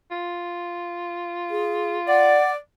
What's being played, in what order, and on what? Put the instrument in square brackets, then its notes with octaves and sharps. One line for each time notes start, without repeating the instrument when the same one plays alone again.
[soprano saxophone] F4
[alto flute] G#4
[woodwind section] D5 [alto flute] F#5